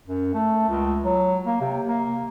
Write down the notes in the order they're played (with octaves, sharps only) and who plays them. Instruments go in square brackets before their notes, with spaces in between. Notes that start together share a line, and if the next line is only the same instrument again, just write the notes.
[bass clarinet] F#2
A3
C#2
F#3
A#3
C3
A#3